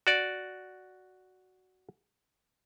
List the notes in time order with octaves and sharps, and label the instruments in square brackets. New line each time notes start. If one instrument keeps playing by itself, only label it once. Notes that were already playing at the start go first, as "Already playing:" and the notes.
[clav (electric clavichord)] F#4 D5